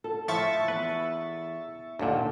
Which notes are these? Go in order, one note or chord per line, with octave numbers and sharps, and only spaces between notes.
A4
A2 F3 E5 C#6 A6
E2 B4
D#2 A#2 D3 A4 G5